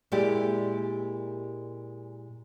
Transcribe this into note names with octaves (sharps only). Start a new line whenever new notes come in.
A#2 G#3 E4 G4 D5